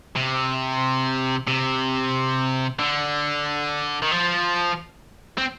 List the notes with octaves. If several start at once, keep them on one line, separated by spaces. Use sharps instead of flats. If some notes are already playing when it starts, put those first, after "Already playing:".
C3
C3
D3
D#3
F3
C4